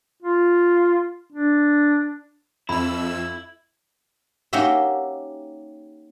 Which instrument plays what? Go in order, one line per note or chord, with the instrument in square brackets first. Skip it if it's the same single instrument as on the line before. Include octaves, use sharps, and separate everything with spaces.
[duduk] F4
D4
[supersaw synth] F2 E6 [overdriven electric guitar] E4 [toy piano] B5
[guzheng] A#3 C#4 D#4 F#4 G4 E5